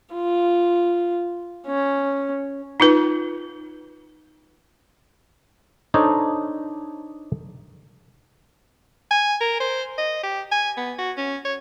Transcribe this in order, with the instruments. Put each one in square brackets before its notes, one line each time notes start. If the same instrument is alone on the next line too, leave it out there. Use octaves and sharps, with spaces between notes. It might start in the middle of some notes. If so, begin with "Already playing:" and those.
[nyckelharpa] F4
C#4
[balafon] D#4 F4 B4
[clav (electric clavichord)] D4 D#4 A4 C5 C#5 D#5
[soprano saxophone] G#5
A#4
C5
D#5
G4
G#5
B3
F#4
C#4
C#5